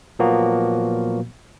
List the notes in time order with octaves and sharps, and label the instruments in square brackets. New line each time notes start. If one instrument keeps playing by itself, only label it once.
[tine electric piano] A#2 F3 F#3 A#3 B3 F#4